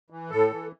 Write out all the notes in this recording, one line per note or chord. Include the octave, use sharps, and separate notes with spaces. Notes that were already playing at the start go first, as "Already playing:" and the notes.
E3
A2 A4
E3